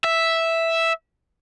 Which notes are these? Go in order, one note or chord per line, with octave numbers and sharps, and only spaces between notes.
E5